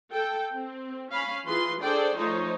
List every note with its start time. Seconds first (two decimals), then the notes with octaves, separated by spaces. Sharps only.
0.11 A4 G5
0.53 C4
1.11 C#4 F5 B5
1.45 E3 F4 G#4 B4 C6
1.81 D4 G#4 A4 C5 D5 G5
2.16 F3 A3 D#4 F4 C5 C#5